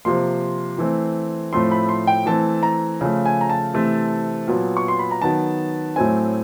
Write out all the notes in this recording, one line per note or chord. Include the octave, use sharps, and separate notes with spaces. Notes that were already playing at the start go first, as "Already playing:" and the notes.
C3 F3 A#3 C6
E3 A3 C4
A2 F3 A3 C4 C6
B5
C6
G5
E3 A3 C4 A5
A#5
C#3 F3 A3
G#5
A#5
A5
C3 E3 A3 C4
A#2 F#3 B3
C#6
C6
B5
A#5
D#3 F#3 B3 A5
A2 F#3 A3 C4 G#5